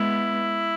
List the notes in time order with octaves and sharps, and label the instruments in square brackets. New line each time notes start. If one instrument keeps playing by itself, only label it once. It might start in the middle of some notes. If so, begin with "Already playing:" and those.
Already playing: [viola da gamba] G#3 B3 [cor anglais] E4